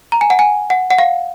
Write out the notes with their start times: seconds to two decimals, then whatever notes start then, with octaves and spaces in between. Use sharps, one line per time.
0.12 A#5
0.21 G#5
0.30 F#5
0.39 G#5
0.70 F#5
0.90 F#5
0.98 F5